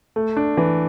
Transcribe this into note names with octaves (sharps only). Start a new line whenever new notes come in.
A3
D4
E3